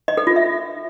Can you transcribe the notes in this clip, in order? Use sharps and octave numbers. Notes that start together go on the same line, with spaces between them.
D#5
A4
F4
E5